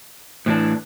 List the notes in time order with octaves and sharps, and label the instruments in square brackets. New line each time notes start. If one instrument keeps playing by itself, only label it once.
[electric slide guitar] A2 E3 D4